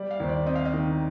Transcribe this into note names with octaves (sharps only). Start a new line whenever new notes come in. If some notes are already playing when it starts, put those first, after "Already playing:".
Already playing: G3 D5
F5
D#2 C5
D5
C4 D#5
F5
D#5
D#3